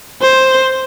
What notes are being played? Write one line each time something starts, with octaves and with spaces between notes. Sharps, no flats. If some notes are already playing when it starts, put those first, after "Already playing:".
C5